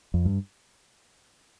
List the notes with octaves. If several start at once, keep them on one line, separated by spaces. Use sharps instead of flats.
F2
G2